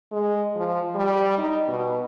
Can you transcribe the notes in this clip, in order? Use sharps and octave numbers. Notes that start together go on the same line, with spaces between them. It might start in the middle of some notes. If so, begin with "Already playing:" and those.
G#3
F3
G3
D#4
B2